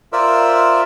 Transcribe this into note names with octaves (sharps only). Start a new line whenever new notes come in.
F4 A#4 C5 D5 E5 E6